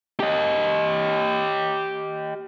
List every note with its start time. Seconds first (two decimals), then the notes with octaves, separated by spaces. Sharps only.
0.20 G4 D#5